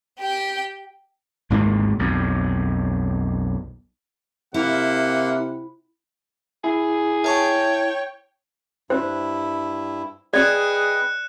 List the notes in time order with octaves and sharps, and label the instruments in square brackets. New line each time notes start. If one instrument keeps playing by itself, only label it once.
[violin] G4 G5
[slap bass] G#1 D2 G#2 A#3
B1 F2
[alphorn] C3 [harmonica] A#3 [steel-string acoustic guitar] E4 [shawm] F#5
[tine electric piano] E4 [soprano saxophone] G#4
[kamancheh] C#5 G5 [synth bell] E5 A5 C#6
[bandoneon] G2 E4 [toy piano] C5
[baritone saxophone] G#4 [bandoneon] B4 D#5 G5 [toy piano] D5 [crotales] F#6 C#7 E7